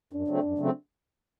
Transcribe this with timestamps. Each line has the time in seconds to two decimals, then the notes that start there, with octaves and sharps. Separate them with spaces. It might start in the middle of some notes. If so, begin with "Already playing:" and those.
0.13 F#2 D4
0.28 C#3 F#3 A3 C4
0.43 F#2
0.58 C#3 F#3 A3 C4